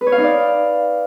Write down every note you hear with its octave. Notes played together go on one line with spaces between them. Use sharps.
B4
C#5
F5
D#4
D5